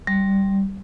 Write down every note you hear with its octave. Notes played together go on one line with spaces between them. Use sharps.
G3